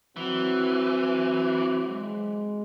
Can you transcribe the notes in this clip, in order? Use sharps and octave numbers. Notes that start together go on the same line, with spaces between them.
E3 F#3 C4 F#4
G#3